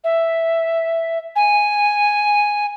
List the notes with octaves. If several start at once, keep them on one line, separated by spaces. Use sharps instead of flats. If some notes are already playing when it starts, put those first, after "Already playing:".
E5
G#5